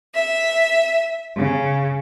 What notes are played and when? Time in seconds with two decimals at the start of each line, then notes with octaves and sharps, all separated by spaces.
0.14 E5
1.35 C#3